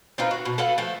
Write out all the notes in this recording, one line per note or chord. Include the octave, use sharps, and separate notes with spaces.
C4 D#4 F4 B4
F#4
B2
A4 B4 F5 F#5
F3 A3